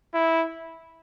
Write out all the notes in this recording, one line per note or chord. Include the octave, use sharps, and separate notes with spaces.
E4